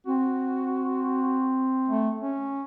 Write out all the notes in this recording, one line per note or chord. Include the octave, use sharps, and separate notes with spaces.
C4 F#4
A3
C#4